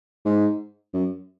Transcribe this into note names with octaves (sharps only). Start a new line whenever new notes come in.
G#2
F#2